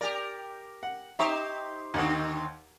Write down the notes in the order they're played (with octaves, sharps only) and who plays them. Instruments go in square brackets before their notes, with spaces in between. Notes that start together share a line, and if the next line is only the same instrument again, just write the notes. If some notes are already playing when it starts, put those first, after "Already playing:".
[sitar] G4 A#4 [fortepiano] D5
[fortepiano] F#5
[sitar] D#4 G4 C5 [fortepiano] E5 A#5 C#6
[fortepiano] D#2 F#5 [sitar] D3 D#3 C4